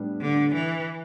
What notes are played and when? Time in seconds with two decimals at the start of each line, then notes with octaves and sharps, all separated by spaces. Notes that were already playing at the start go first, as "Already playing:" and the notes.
Already playing: A2 G3 B3 D4
0.21 D3
0.55 E3